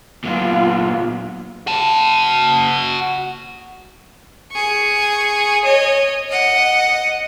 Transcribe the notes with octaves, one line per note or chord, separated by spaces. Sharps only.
A#2 F#3 B3 F4
F#4 A5
G#4 C#6
C#5 D#5
D#5 F#5